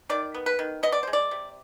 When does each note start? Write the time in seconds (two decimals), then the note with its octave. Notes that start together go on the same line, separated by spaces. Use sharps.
0.09 D#3 D5
0.34 B3
0.46 B4
0.59 D#3
0.83 B3 D#5
0.92 D5
1.03 G#3 C5
1.13 D5
1.31 C3